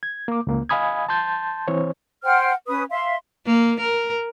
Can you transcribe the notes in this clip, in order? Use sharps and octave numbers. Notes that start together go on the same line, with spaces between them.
G#6
A#3 D6
C#2 A#3
D#5 F5 G#5 B5 D#6 G#6
A5 C6 G6 A6
E3 C4 C5 C#5
C5 F#5 G5 F6
C#4 B4 D#6
E5 F5 C6
A#3
A#4